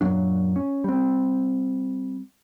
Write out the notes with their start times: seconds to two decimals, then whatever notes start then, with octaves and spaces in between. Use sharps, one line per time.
0.01 F#2 A#2 F#3 D4
0.56 C#4
0.84 G3 C4